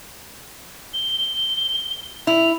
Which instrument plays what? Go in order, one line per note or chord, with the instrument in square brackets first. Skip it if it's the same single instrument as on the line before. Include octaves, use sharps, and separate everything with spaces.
[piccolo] G7
[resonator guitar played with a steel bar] E4 [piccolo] F7